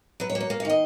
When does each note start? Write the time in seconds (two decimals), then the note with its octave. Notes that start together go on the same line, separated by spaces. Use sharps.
0.20 F#3 B4
0.30 C#5
0.35 A#3
0.41 C#5
0.50 A#3
0.60 F5
0.65 D#3 D#5